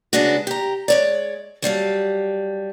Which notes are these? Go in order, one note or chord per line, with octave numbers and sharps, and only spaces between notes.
C#3 G#3 B3 D4 D#4 F#4
G4 A#5
G#3 C#5 D5
F#3 G3 F5 A5